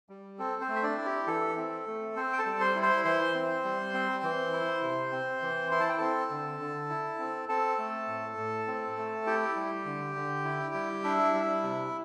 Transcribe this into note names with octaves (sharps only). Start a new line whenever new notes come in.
G3
C4 A4
C4 C5
A3
E5
D4 D5
E4
G4
E3 A4
C4
A3
C4 C5
G5
A4 A5
G3
C5 C6
E4
C5 C6
E3 C5 C6
C4
G3
C4
E3
E4
C3
C4
E3
E4 C6
A5
G5
C4 A4 A5
D3
D3
E4
C4
C4 A4 A5
A3
A2
A2
C4
A3
E4 G4 G5
G3
D3
D3
E4
G3
D4 E4 E5
G3
C3